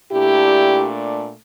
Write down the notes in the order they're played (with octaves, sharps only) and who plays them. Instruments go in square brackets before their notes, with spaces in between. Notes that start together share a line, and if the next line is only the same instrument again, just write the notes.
[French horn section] A#2 A3 D4 E4 G4